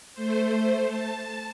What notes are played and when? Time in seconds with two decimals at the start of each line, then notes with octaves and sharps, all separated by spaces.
0.13 A3 C5
0.85 A5